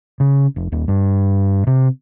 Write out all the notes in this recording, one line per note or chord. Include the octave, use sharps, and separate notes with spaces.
C#3
F1
D#1
G2
C3